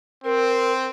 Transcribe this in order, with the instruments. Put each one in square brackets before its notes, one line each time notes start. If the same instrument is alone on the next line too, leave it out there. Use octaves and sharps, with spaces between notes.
[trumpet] C4 [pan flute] A#4